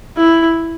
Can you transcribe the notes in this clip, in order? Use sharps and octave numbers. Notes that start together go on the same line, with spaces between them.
E4